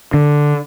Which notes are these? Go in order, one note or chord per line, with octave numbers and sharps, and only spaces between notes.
D3